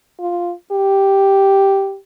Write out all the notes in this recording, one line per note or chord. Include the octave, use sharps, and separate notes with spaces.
F4
G4